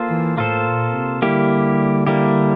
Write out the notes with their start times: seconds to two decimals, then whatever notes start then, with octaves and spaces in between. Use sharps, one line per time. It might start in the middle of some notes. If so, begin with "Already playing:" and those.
Already playing: A#3 F4 A4 C5
0.09 E3
0.37 A2 A#3 F4 A4 C5
0.66 A#2
0.95 C3
1.22 D3 G3 A#3 E4 G4
2.07 G3 A#3 E4 G4